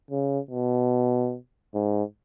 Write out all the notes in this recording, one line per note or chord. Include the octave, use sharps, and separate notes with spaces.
C#3
B2
G#2